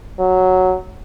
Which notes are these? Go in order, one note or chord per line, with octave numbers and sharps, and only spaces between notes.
F#3